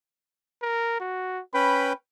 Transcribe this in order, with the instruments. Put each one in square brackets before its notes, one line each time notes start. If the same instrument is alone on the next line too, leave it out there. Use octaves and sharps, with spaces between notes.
[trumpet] A#4
F#4
[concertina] C#4 B4 G5 [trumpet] B5